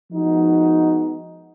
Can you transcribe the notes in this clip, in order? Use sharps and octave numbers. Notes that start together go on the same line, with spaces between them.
F3 G#3 B3 D#4 F#4